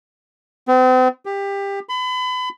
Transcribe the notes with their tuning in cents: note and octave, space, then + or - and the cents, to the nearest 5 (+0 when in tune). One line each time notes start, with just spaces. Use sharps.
C4 -40
G4 +20
B5 +35